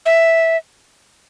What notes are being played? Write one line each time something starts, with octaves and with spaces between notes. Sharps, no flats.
E5